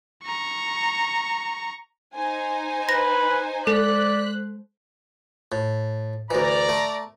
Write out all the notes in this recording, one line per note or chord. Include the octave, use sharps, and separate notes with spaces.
A#5 C#6
D#4 C5 G#5
B4 A#6
G#3 A4 C5 D5 F#6 B6
A2
D2 E3 D5 A#5
A3